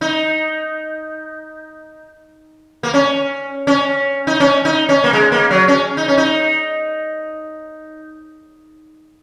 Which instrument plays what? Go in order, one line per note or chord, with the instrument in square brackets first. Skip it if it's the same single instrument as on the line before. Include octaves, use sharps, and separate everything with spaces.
[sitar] D#4
A#3
C#4
C#4
D#4
C#4
D#4
C#4
A#3
G#3
A#3
F#3
C#4
D#4
C#4
D#4